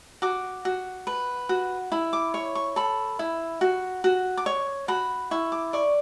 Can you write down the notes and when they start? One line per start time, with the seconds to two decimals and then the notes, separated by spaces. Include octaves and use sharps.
0.22 F#4 D6
0.65 F#4
1.07 B4
1.49 F#4
1.92 E4 B5
2.13 D6
2.34 C#5 C#6
2.55 C#6
2.76 A4 B5
3.19 E4
3.61 F#4
4.04 F#4
4.37 D6
4.46 C#5 C#6
4.88 F#4 B5
5.31 E4 C#6
5.52 D6
5.73 D5 C#6